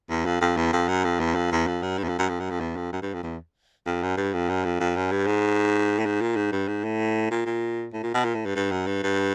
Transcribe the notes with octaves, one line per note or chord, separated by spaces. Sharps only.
E2
F2
F2
E2
F2
F#2
F2
E2
F2
E2
F2
F#2
G2
E2
F2
F#2
F2
F#2
F2
E2
F2
F#2
G2
F2
E2
F2
F#2
G2
F2
F#2
F2
F2
F#2
G2
G#2
A2
G#2
A#2
G#2
G2
G#2
A2
A#2
A#2
A2
A#2
B2
A#2
A2
G2
G2
F#2
G2
G2